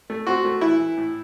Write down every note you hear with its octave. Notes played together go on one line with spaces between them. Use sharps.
A3
C4 F#4
A3
E3 E4
E3
A2